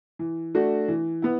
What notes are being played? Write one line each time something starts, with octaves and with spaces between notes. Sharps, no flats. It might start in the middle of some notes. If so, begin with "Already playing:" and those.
E3
A3 D4 F#4
E3
B3 E4